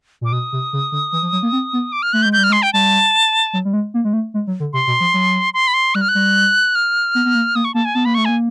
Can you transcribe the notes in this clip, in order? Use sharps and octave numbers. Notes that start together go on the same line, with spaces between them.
A#2 D6
B2 D#6
C3
C#3
D3
E3
F3
F#3
A#3
C4
B3
D6
F6
A3 F#6
G6
G#3
G6
G3
F6
G#3
C6
G5
G3 A5
F#3
G3
G#3
A#3
G#3
A3
G#3
F#3
D3
C3 C6
B2
F3
F#3
C6
B5
C6
G3 F#6
F6
F#6
G3
F6
B3
B3
A#3
A#3 D#6
C#6
A#3 A5
G#5
B3 A5
A#3 B5
A3 C#6
A#3 G#5